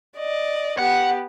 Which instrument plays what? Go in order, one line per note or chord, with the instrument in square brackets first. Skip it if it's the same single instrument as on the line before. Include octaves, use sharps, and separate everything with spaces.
[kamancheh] D5 D#5
[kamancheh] B3 G4 [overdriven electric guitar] F#5